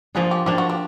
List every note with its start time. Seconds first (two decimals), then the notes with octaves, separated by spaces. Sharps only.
0.15 F3 A#3 D4 G#4
0.31 G4
0.46 F3 A#3 D4 G4
0.58 F#4
0.70 G4